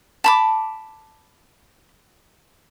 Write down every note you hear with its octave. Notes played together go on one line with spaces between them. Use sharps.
A5 B5 D6